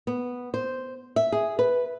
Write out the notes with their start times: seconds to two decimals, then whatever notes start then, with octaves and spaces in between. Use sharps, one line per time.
0.07 B3
0.54 C5
1.16 E5
1.32 G#4
1.59 B4